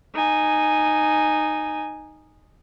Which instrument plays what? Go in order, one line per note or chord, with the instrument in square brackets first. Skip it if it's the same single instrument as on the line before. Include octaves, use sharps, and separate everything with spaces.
[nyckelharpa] D#4 G#5